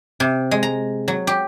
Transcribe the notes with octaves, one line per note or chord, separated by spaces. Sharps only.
C3
G#3
A#5
F#3
G4